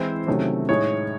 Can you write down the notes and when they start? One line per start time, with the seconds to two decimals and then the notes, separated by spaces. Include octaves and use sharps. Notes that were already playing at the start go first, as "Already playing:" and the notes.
Already playing: E3 G#3 C4 E4 C5
0.27 C3 D#3 F#3 A3 C#4
0.69 A2 G#3 D#4 C#5